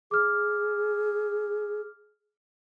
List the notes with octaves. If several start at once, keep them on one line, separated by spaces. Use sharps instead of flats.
G#4 D6 F6